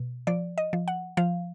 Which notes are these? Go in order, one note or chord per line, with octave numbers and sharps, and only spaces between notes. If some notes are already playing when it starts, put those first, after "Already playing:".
Already playing: B2
F3 D5
D#5
F3
F#5
F3 F5